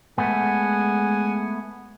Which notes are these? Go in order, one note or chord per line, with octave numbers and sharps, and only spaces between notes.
G#3 A3 B3 F#5 G#5